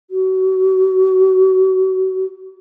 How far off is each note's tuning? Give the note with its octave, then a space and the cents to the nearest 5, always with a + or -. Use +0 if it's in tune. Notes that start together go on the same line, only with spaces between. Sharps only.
F#4 +35